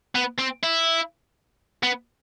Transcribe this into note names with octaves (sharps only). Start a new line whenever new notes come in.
B3
C4
E4
B3